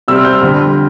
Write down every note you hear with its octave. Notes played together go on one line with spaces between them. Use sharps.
C3 G3 C4 E6
F6
G6
F6
F2 D3 G3 C4